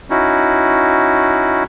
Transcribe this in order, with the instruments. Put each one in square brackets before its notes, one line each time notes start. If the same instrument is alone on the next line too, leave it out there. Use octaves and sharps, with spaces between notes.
[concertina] C#4 D#4 E4 F#4